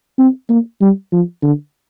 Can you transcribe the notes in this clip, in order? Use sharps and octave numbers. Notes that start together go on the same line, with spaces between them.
C4
A#3
G3
F3
D3